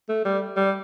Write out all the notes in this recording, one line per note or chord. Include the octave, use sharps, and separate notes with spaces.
A3
G3
G3